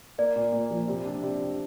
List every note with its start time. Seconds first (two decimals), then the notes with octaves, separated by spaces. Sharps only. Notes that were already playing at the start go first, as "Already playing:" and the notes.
0.18 A#3 D5
0.36 A#2
0.53 A#2
0.70 F3
0.88 C3
1.05 D4
1.23 C3
1.40 C3